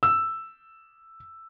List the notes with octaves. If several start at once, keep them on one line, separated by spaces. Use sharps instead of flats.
E6